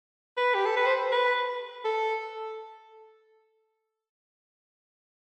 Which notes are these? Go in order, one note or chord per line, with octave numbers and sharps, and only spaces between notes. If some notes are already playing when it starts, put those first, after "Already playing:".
B4
G4
A4
B4
C5
B4
A4